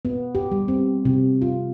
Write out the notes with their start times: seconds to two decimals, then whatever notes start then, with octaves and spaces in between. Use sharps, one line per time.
0.05 B3
0.35 G4
0.52 G3
0.68 C4
1.05 C3
1.42 F4